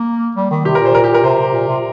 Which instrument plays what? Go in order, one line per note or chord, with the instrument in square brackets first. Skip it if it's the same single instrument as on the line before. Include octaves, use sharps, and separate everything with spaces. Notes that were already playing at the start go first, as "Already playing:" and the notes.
Already playing: [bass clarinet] A#3
G3
D#3
[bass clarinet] C3 [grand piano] G4
[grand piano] A#4
[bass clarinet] A#2
[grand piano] C5
A#4
G4
A#4
[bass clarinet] C3 [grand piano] C5
[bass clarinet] C3
A#2
C3